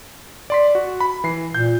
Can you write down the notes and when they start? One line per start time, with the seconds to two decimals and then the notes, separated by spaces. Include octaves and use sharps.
0.50 D5 C6 B6
0.75 F#4
1.00 B5
1.24 E3 C7
1.54 A#2 G6